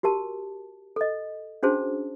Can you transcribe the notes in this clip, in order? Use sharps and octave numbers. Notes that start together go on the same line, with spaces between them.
F#4 G4 A#4 A5
A4 D#5
C#4 D4 F#4 G#4 C5 A5